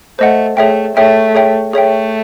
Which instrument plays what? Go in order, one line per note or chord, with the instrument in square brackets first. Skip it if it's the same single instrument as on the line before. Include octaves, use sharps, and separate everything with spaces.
[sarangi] A3 [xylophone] C5 D#5 F#5
[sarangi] A3 [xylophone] G#4 C#5 E5 G5
[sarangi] A3 [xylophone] G#4 C#5 E5 G5
[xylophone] G#4 C#5 E5 G5
[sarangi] A3 [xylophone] G#4 C#5 E5 G5